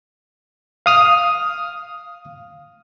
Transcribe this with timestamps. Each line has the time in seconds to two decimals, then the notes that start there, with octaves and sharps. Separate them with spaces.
0.86 F5 D#6 F6